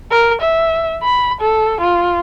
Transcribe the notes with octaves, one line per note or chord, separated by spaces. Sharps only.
A#4
E5
B5
A4
F4